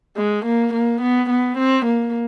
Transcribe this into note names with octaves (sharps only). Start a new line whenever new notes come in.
G#3
A#3
A#3
B3
B3
C4
A#3